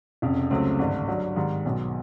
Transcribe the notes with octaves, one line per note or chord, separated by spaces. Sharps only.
F1 F2 C#3
C#2 C#3 F#3 A3 C4
G#1 G2 D3
G2 D3 F#3
G#2 D#3 G3
B1 B2 F#3 B3